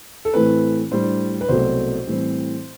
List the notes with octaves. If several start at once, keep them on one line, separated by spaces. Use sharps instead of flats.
A4
A2 E3 A3 C4 B4
A2 G3 D4 C5
B4
C2 B2 F#3 A3 C5
A2 E3 G3 C4